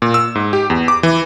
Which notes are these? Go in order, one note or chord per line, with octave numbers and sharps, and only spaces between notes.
A#2
E6
G#2
G4
E2
D6
E3